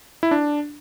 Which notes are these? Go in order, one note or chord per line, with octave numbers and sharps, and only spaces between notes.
E4
D4